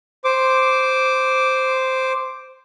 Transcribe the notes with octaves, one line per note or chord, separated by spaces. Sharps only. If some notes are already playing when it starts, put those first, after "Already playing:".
C5 D6